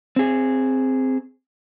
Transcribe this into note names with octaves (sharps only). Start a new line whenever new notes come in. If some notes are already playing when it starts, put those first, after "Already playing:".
C4 G#4